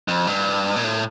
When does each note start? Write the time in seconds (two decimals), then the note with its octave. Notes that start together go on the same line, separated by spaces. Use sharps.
0.08 F2
0.27 G2
0.76 A#2
0.84 A2